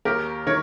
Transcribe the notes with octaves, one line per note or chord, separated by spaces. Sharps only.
D#2 G4 A#4
D#3 A#4 C#5